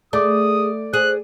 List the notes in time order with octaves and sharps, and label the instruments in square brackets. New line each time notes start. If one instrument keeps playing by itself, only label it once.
[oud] A3 [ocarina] G#4 [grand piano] D5 D6 [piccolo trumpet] D#6
[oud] G#4 [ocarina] C5 [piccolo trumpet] F#6